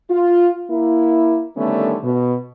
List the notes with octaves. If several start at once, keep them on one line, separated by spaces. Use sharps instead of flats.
F4
A#3 E4
D3 D#3 G3 A3 B3 C#4
B2